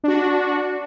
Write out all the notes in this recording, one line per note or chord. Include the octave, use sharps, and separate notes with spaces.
D4 F#4